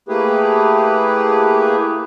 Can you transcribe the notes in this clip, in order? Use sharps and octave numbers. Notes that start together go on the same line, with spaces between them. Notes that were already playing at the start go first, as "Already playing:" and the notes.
A3 A#3 E4 G4 G#4 B4